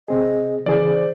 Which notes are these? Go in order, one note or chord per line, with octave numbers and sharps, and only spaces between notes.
C3 C4 G#4 D#5
C#3 E3 G#4 C5 D5